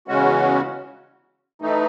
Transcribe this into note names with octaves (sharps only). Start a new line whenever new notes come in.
E2 C#3 G#3 C#4 F#4
E3 A3 D#4